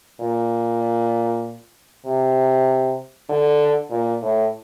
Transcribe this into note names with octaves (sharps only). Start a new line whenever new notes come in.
A#2
C3
D3
A#2
A2